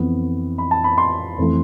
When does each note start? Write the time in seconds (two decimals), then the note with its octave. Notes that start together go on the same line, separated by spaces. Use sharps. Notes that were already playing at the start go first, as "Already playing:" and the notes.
Already playing: F2 E3 B3
0.58 B5
0.71 A5
0.84 B5
0.98 C6
1.38 F2 E3 A3